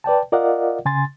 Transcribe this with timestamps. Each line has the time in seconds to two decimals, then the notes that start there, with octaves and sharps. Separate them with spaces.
0.04 B4 D5 G5 A5
0.32 F4 A#4 D5 D#5 F5 F#5
0.85 C#3 G#5 C6 A6